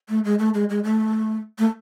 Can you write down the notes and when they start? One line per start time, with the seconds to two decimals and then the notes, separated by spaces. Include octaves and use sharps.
0.09 A3
0.24 G#3
0.39 A3
0.54 G#3
0.69 G#3
0.84 A3
1.58 A3